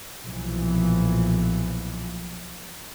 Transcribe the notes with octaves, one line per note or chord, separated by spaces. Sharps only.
B1 A#2 E3 F3